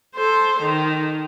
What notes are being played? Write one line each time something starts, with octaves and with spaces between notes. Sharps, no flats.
A4 C5
D#3